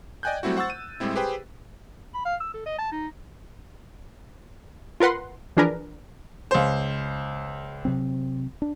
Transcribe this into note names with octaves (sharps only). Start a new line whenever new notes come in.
D5 D#5 G5 G#5 F#6 G6
F#3 G3 A3 C4 E4 F#4
C5 F#5 C#6 E6 A6
D#7
A2 G3 G#3 C4 E4
G4 G#4 B4 C5 G5
B5
F5
E6
A4
D#5
A5
D#4
F4 A#4 B4 F#5 C6
E3 F3 D4 G#4 A#4 B4
C#2 C5
C3 F#3 C4
D4